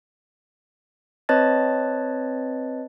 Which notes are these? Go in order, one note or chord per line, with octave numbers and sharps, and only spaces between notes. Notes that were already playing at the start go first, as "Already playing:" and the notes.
C4 B4 C#5 D#5 A5 A6